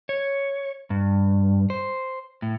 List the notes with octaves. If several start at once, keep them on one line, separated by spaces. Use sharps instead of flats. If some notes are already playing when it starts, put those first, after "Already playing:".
C#5
G2
C5
A2